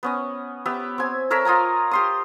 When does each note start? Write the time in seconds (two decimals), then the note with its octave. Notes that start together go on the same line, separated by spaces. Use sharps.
0.03 B3 C#4 D#5
0.65 B3 G4 E5
0.98 C4 G#5
1.30 A4 A#4 C#5 E5
1.45 F4 D#5 G#5 A#5
1.91 G4 C6 D#6